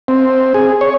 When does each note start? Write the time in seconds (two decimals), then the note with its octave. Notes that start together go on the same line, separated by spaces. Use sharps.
0.08 C4
0.54 G#4
0.81 C#5